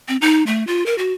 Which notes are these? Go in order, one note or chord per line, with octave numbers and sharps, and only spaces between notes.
C4
D#4
A3
F4
A#4
F#4